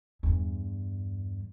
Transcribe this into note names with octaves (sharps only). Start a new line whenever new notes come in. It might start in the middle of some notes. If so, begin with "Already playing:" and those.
E2 G2